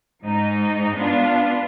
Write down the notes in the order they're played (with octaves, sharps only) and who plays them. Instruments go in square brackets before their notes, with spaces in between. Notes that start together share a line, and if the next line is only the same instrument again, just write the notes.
[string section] G#2 D#4
B3 D4 F4